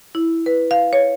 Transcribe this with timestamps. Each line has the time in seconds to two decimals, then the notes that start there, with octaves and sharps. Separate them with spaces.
0.15 E4
0.46 B4
0.71 F5
0.93 C#5